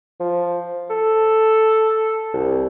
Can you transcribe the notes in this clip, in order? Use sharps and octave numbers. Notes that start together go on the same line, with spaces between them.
F3
A4
C2